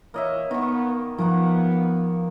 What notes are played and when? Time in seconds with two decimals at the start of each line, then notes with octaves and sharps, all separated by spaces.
0.14 E3 A#3 C#5 D#5 E5
0.51 D#3 B3 C#6
1.18 D#3 F3 A#3 B3 F#5